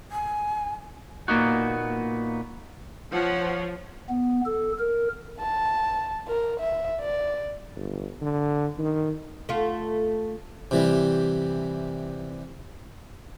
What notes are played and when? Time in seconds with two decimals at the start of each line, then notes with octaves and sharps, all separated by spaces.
0.12 G#5
1.28 A#2 A#3 B3 D#4 F#4
3.12 F3 C#5 F#5
4.09 B3
4.46 A4
4.79 A#4
5.40 A5
6.28 A#4
6.60 E5
7.00 D5
7.76 G1
8.21 D3
8.78 D#3
9.49 A3 F4
10.71 C3 E3 G3